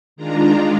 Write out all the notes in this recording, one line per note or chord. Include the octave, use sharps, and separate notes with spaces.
D#3 G#3 D4 F4 A#5